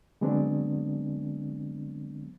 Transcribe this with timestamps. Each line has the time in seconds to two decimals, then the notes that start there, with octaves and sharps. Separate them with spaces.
0.21 D3 F#3 G#3 B3 C4 D4